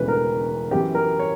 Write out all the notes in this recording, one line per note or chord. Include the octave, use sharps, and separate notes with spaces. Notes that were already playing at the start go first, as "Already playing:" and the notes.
Already playing: E1 D2 C#3 E3 B4
A#4
F#2 E3 B3 G4
A#4
C#5